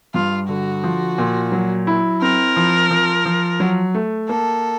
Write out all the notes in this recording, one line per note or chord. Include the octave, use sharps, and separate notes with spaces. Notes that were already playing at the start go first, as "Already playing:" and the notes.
G2 F4
D3 F#4
F3
A#2
F#3
E4
C4 A#4
F3
F3
F3
F#3
A3
A#3 A4